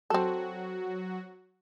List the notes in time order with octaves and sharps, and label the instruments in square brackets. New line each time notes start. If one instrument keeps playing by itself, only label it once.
[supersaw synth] F#3 F#4 [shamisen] C4 A4